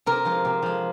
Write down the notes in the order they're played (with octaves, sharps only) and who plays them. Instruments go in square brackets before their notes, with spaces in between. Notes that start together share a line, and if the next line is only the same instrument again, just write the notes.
[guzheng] C3 A#4
F3 G#3
C3
F3 G#3